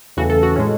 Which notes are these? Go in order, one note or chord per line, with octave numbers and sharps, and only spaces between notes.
E2 C#3 E3 A3 F#4
A4
F#4
A2 G#3 C#4